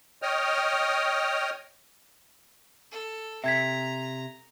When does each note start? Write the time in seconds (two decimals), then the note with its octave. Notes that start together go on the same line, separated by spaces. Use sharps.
0.22 C#5 D#5 G5 D#6 F6
2.91 A4
3.44 C3 E5 A#5 G#6 B6